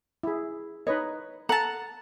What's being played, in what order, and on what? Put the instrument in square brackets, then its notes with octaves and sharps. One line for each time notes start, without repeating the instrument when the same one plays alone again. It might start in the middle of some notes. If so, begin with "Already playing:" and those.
[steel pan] E4 G#4
[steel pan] D#4 B4 D#5 [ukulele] C#5
[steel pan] A4 [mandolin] F#5 A5 [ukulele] A#5